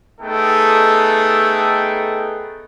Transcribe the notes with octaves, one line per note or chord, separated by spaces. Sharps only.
A3 B3 D#4 G#4 A4 G5